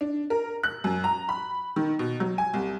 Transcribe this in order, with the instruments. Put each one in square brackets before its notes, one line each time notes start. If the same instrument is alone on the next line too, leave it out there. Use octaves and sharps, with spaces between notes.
[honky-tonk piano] D4
A#4
F#6
F#2
A#5
B5
D#3
B2
F#3
G#5
C2